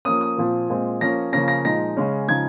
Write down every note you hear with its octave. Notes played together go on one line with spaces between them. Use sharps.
F3 A#3 C#4 D#6
D#6
A#2 F3 C4
A#2 G#3 C4
F3 A#3 C#4 A#6
C#3 F3 A#3 C#4 A#6
A#6
A#2 F3 G#3 D#4 A#6
C#3 G#3 C#4
C#3 F3 G#3 D#4 G#6